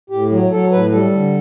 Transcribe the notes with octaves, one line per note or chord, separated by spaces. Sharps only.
A2 G4
F#3
F#3 A4
A2 B4
G3 A4
D3